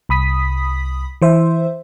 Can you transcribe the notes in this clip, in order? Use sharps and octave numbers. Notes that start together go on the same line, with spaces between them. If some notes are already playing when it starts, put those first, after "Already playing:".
C2 B5 D#6 B6
E3 C5 E5